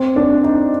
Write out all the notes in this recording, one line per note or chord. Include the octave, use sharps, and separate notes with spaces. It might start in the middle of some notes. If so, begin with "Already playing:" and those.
Already playing: C4
D4
D#4